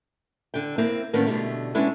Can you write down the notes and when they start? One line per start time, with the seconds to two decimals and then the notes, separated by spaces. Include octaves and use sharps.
0.54 D3 G5
0.78 A#3 C4 E4
1.13 A2 D#3 A#3 B3 C#4 D4
1.26 B2 D3 G3 A3 D4
1.75 G#3 B3 C#4 D4 E4 A4